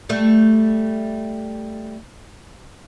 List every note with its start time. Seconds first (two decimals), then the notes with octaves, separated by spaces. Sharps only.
0.09 G3 A3